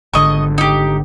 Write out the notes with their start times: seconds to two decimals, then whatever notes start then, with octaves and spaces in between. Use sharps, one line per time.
0.13 G#1 D3 D#5 C#6
0.58 D#4 G4